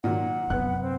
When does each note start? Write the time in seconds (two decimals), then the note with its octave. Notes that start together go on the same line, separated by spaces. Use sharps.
0.04 A#2 D#3 F#3 F#5
0.50 F#2 C3 B3 F#6
0.81 C4